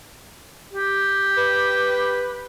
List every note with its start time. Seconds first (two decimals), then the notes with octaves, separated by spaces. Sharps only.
0.73 G4
1.37 B4